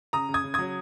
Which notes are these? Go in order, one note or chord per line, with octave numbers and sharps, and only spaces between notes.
C#3 A#5 D#6
C#3
D#6 G#6
C#3
F#3 D#6 G#6